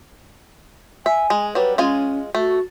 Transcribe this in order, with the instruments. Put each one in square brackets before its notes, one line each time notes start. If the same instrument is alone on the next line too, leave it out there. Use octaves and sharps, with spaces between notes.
[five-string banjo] E5 [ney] G#5
[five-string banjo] G#3
[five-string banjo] F#3 G3 [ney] B4
[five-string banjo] G#3 F4 G#5 [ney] C#4
[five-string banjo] A3 [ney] F#4